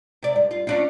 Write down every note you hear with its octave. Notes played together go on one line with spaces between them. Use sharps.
C3 D5
G2
F4
C#4 D4 F4